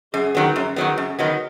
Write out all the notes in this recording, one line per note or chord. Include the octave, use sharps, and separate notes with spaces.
F#2 G#4
D#3 F#3 B3
F#2 G#4
D#3 F#3 B3
F#2
D#3 F#3 B3